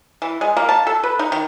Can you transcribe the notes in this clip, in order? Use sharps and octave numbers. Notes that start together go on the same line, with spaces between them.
E3
G#3
A#3
A5
A4
B4
D#4
D#3